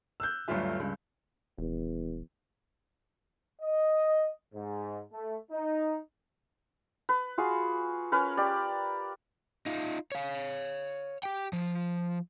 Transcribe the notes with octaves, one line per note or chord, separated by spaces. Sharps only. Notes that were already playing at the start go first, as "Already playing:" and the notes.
E6 F#6 G6
G1 D2 G2 F#3 F4 E5
C#2 G2
D#1 E2
D#5
G#2
A3
D#4
B4
F4 F#4 G#4
C#4 A#4 B4
G4 D5
D#4 F4
C#5 F5
G4 G5
F3